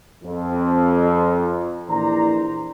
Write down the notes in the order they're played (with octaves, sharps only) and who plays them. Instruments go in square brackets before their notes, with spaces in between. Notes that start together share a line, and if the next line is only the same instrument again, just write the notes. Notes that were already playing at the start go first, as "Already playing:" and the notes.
[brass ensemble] F2
A#1 E3 C5 D5 A#5